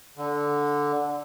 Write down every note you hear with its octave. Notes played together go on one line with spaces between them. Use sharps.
D3